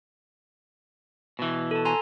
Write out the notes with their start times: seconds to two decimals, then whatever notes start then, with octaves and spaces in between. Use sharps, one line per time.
1.39 B2 E3
1.71 A4 A5
1.85 G#5 A#5 C6